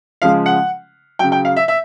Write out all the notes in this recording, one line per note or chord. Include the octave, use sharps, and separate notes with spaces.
C#3 F3 G#3 F5
F#5
C#3 F#3 G5
G5
F5
E5
E5